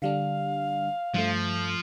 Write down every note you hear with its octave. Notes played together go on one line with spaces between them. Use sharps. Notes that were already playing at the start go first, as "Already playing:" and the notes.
D3 G3 D4 F5
G2 F3 A3